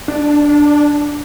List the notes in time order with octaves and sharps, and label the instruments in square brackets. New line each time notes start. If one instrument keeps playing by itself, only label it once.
[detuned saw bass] D4